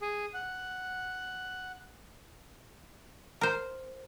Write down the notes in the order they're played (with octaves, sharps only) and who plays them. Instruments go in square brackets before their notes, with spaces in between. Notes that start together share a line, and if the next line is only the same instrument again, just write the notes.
[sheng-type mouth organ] G#4
F#5
[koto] A#4 C5